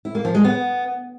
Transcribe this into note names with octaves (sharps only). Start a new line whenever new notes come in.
E4
A#3
F3
G#3
B3